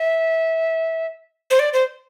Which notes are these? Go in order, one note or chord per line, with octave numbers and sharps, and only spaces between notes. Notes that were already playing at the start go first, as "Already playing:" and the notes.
Already playing: E5
C5
D5
C5